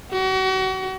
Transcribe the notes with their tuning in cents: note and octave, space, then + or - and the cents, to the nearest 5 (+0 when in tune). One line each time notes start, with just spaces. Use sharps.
F#4 +35